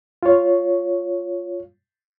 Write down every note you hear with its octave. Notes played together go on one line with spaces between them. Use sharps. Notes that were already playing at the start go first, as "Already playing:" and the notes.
F4 C#5